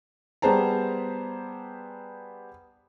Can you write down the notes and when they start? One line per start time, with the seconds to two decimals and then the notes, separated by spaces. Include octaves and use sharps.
0.42 G3 B3 G#4 C5 A5 A#5